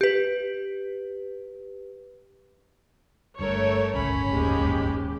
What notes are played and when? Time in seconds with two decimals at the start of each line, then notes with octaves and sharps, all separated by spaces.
0.01 G4 B4
3.39 G1 G2 A3 A4 A#4 C#5
3.94 D1 G1 C#2 C#4 B5
4.31 D#2 G#2 G#3 G4